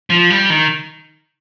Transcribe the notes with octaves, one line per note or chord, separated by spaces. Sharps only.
F3
G3
D#3